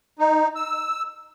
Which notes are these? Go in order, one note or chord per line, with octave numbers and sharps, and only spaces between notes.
D#4
E6